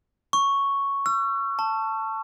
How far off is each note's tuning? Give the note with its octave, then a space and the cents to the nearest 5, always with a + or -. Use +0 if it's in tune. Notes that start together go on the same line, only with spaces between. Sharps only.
C#6 +0
E6 +45
A5 +10